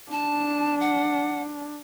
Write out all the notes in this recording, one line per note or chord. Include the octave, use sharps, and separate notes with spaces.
D4 A5
F#5